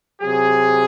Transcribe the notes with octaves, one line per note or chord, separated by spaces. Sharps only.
C3 F#3 G#4